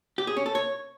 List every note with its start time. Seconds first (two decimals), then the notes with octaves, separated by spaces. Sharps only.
0.18 G4
0.27 G#4
0.37 C#4
0.46 A4
0.55 C#5